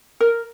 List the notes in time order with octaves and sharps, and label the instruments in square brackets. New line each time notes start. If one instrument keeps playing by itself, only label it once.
[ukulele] A#4